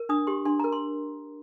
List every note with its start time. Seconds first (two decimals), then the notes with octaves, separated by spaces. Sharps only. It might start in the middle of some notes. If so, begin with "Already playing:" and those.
Already playing: A#4
0.09 D4 D#6
0.27 G4 C6
0.45 D4 C6
0.60 A#4 A#5
0.72 C6